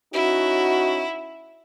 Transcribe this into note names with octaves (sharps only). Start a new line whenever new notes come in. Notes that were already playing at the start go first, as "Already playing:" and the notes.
C#4 D#4 E4 F#4